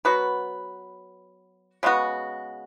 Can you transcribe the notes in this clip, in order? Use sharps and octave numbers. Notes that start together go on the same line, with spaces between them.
F#3 B3 F#4 B4
C#3 G#3 B3 F#4